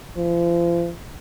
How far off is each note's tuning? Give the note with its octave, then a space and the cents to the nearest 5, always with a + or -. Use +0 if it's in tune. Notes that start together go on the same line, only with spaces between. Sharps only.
F3 -35